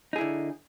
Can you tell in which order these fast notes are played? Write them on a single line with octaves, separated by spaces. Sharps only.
D#4 G#4 E4 D3